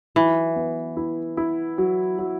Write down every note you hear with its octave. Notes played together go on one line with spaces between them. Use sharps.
E3 F#3
B3
E4
E4
F#3
F#3